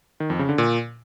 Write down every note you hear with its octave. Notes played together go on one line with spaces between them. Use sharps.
D#3
F2
C#3
D3
A#2